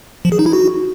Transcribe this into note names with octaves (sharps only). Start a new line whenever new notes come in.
F3
G#4
D#4
E4
F#4